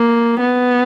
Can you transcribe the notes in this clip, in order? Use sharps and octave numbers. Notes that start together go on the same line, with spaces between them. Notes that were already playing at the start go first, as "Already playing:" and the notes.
Already playing: A#3
B3